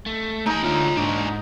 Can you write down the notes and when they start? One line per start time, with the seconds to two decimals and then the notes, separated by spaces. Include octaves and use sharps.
0.06 A3
0.46 A3 D#4 G#5
0.64 D2 D3 F4 C#5
0.97 G#2 D4 C5